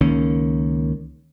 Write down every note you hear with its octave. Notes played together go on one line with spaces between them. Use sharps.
C#2 D#3 A#3 C#4